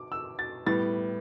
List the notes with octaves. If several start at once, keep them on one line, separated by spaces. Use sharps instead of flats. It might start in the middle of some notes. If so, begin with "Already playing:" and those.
Already playing: D6
E6
A6
A2 G3 B3 A6